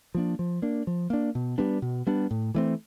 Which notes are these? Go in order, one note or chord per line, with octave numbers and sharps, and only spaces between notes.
F3 A#3 D4
F3
A#3 D4
F3
A#3 D4
B2
G3 B3 D4
B2
G3 B3 D4
A2
E3 A3 C4